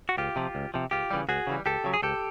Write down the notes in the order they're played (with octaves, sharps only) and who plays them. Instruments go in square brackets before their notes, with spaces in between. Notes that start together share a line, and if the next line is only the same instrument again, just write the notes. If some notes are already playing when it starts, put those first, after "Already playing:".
[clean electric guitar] F#4
C#2 F4 G4
C3 F3
C#2
C3 F3
C#2 F4 G4
C#3 E3 G3
C#2 F#4 G#4
C#3 E3 G3
C#2 G4 A4
C#3 F#3
G#4
C#2 G4 A4